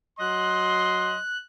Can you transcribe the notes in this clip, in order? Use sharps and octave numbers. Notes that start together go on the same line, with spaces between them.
F#3 D#5 C6 F#6